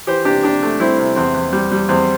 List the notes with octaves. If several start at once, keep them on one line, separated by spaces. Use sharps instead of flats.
E3 G4 C5
C3 D4 G4
C3 D4 G4
A3
G3 C4 E4
C3
E2 C4
E2
G3
G3
E2 C4